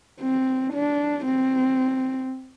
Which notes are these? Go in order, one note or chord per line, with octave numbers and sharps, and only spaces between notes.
C4
D4
C4